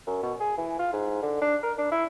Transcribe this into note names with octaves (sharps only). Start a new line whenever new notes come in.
F#2
B2
G#4
E3
F4
G#2
D3
D4
A#4
D4
E4